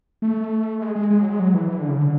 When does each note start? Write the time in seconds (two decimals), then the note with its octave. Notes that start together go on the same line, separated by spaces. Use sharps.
0.22 A3
0.81 G#3
0.95 G#3
1.10 G#3
1.20 F#3
1.30 G#3
1.40 F#3
1.54 E3
1.69 E3
1.79 D3
1.89 C#3
1.98 D3